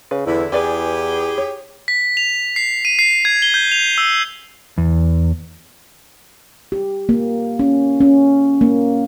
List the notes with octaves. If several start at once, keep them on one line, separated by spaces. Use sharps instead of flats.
C#3 B4
E2 D3 E4
E2 E4 G4 G#4 B4 D5 G#5
C#5
B6
F7
C7
D#7
C7
G#6
G7
G6
F7
E6
E2
G4
A#3
C#4
C#4
A#3